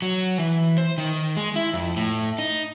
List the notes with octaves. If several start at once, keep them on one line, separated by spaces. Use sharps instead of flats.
F#3
E3
C5
D#3
G#3
E4
F2
A2
D#4